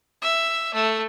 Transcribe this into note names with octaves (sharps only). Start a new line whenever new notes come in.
E5
A3